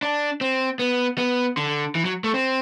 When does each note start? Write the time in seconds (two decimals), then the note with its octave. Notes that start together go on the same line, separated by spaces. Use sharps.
0.03 D4
0.41 C4
0.79 B3
1.18 B3
1.57 D3
1.95 E3
2.05 F#3
2.24 A3
2.34 C4